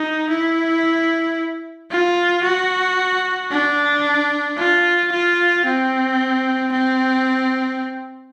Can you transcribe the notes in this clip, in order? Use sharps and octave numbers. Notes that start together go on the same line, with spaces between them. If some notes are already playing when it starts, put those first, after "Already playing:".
Already playing: D#4
E4
F4
F#4
D4
F4
F4
C4
C4